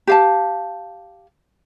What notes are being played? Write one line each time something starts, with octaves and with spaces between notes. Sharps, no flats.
G4 F5 A5